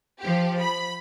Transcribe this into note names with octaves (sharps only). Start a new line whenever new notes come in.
F3 G4
B5